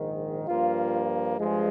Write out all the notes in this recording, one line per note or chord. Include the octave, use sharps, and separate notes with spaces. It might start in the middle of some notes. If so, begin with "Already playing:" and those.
Already playing: A#1 G#2 D#3
G2 F3 A#3 F4
G2 F3 G#3